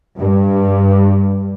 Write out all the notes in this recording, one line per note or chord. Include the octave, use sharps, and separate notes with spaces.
G2